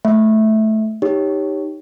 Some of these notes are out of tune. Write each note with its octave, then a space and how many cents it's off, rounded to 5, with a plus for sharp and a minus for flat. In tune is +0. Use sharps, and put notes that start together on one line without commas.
A3 -10 E5 -5
D#4 +0 G4 +0 C#5 +0